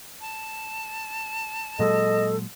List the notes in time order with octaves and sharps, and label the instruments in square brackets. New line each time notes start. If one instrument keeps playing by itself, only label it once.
[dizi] A5
[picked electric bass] A#2 F#3 G#3 [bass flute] A4 [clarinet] D#5